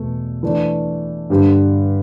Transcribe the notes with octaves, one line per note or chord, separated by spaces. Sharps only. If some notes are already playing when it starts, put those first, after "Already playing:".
Already playing: E2 B2 A3
E3 A3 D4
G2 D3 G3